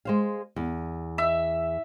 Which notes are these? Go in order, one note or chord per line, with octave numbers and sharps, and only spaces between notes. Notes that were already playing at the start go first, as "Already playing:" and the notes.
G#3 C5 F5
E2
E5